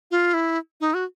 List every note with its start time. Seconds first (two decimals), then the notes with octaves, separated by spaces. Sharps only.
0.11 F4
0.34 E4
0.81 D#4
0.94 F#4